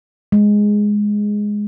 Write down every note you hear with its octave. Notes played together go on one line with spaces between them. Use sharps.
G#3